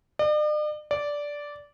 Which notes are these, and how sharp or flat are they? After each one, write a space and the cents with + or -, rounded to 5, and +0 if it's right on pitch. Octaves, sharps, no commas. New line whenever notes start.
D5 +45
D5 -10